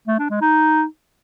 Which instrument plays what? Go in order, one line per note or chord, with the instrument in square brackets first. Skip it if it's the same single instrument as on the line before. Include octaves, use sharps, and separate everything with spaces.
[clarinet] A3
D4
G#3
D#4